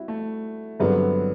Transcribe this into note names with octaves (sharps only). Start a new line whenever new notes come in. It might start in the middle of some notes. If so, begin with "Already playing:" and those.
Already playing: G3 C4 E4 F#4
A3
G2 D3 F#3 B3 C4